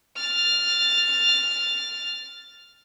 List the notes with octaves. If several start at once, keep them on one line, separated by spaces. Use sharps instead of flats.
F6 A6